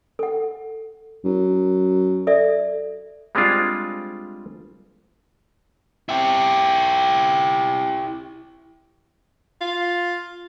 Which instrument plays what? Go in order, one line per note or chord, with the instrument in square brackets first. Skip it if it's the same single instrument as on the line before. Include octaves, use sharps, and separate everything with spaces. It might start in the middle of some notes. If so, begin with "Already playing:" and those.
[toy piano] A4 F#5
[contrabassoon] F#2
[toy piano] A4 D5 E5
[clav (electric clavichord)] G3 G#3 C4 D4 F4 G#4
[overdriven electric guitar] E4 G4
[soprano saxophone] F4